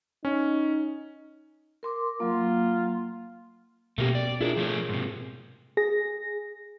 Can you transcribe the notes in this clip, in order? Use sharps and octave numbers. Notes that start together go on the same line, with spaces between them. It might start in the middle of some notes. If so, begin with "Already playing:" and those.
C#4 D#4
A#4 C6 D6
F#3 A#3 F4
B2 A3 A#3 C#4 G4
D5
D4 E4 F4 G#4 A#4
F3 A3 C#5
G#2 C3
G#4 A#6